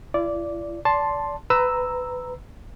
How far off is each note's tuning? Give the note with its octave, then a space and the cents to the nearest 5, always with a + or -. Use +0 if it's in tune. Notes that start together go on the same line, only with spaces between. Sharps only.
E4 +45 D5 -10
D5 -25 A5 +0 C6 +5
B4 +20 A#5 +0 E6 +0